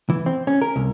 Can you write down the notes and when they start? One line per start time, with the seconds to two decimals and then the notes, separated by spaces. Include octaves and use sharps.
0.10 E3
0.26 C4
0.47 C#4
0.61 A#4
0.76 C2